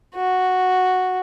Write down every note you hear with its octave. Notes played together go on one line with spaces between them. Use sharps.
F#4